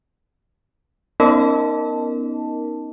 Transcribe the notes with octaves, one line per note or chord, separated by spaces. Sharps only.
B3 C#4 D#4 A#4 D#5 A5